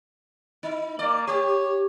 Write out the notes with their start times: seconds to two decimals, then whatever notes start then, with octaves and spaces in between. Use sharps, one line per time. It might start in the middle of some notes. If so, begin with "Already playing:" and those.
0.63 D#4
0.99 A#3 D5
1.27 G4 C#5